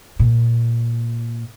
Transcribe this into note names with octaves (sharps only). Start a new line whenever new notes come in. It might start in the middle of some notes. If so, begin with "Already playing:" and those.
A#2